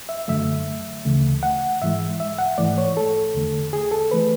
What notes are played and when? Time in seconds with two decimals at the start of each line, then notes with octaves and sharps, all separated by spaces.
0.09 E5
0.28 F#2 D3 F#3 A3 E5
1.05 D2 C#3 E3 A3
1.43 F#5
1.82 G#2 E3 G#3 E5
2.20 E5
2.39 F#5
2.58 G#2 E3 A3 D5
2.78 C#5
2.97 A4
3.35 E2 D3 A3
3.73 G#4
3.91 A4
4.11 E3 A3 B4